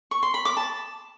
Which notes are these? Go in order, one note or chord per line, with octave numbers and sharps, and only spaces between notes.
C#6
C6
B5
D6
A5